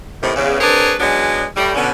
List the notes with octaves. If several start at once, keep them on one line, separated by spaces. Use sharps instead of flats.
A2 C3 D#3
E2 C#3
C4 D4 G#4 A#4 B4 C#5
F#3 G#3 B3 C#4 D4
A2 G3
B2 D3 C#4